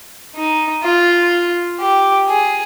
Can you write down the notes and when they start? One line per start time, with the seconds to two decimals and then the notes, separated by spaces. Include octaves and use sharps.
0.36 D#4
0.84 F4
1.80 G4
2.28 G#4